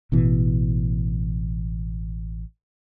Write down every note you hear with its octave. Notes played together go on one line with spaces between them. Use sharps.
A1 B2 E3